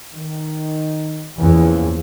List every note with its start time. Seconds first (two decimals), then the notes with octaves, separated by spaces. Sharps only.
0.14 D#3
1.39 E2 A#2 C#3 F3